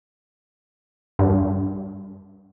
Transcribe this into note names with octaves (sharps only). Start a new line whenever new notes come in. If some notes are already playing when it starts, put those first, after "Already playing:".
G2